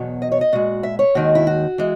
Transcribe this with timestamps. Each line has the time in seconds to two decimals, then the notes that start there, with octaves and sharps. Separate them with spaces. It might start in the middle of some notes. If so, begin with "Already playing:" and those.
Already playing: E2 B2 F#3
0.22 D#5
0.32 C#5
0.41 D#5
0.53 A#2 G#3 F#4
0.83 E5
0.99 C#5
1.15 D#2 D#3 G#3 F#4
1.35 E4
1.47 F#4
1.78 E3 G#3